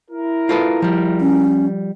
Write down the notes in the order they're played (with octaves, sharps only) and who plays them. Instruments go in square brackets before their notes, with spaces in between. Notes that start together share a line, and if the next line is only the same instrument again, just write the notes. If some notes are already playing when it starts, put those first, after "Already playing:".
[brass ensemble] E4 A#4
[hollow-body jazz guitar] F4 A4 B4
F3 G3
[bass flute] C#4